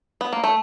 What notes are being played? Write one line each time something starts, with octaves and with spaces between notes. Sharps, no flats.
B3
A#3
A3